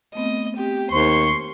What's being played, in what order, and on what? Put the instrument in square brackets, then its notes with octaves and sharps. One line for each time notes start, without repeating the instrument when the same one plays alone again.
[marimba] A3 B3 C4 [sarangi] D#5
[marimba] C4 [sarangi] G4
[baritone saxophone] D#2 [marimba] C5 [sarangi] C6 [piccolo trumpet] C#6